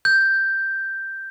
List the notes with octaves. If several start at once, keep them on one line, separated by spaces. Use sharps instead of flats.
G6